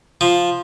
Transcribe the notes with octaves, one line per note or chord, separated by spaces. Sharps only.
F3